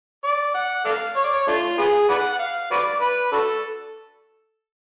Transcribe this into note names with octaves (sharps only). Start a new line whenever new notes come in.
D5
F#5
A4 D5 F5
C#5
D5
C#5
A3 D4 F4
B3 F4 G#4
B4 D5 F#5
F#5
F5
F#4 B4 D5
B4
D4 F#4 A4